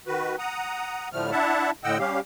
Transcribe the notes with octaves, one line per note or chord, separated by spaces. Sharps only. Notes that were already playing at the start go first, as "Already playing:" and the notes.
D#3 F#4 B4
F#5 A#5 D#6
A2 D3 F3 G3 A3 F6
D4 E4 E5 F#5 A5
A2 D3 D#5 F#5 G5 E6
G3 C#4 G4 F5